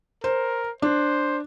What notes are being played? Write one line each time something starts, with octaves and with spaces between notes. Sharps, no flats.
A#4 C5
D4 C5